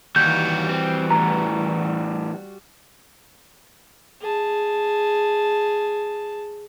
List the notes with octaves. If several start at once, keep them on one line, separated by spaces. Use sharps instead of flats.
D#2 E3 G3 F#4 G6
C4
E2 A2 A#5
G#4 A5